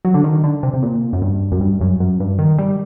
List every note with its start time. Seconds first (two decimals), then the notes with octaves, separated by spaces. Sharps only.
0.05 F#3
0.14 D3
0.24 D#3
0.44 D3
0.63 C3
0.73 C3
0.83 A#2
1.13 F#2
1.22 G2
1.52 F#2
1.60 G2
1.81 F#2
2.00 F#2
2.20 G2
2.39 D#3
2.59 G3